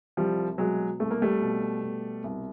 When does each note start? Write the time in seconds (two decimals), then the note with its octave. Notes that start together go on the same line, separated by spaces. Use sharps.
0.17 C2 F3 G3
0.58 B2 F#3 G#3
1.00 C2 A3
1.11 A#3
1.22 G3 A3
1.41 B2
1.82 B2
2.24 C2